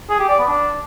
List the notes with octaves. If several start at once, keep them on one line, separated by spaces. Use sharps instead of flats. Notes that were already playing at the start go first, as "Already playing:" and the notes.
G#4
G4
D5
B3
D4